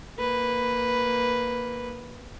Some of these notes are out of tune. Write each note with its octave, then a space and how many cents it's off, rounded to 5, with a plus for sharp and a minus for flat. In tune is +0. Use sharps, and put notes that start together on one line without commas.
A#3 -5 B4 +0